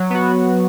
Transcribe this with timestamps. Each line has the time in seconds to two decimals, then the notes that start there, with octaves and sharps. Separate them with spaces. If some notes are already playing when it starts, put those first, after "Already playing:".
Already playing: F#3
0.10 B3 F#4